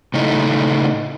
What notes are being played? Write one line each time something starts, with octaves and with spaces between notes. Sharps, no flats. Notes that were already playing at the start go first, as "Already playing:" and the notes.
A2 C#3 D#4 E4 A4